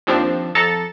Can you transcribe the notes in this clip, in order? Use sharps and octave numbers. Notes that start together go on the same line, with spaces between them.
D#2 F3 C4 D4
F2 A4 A#5 A6 C#7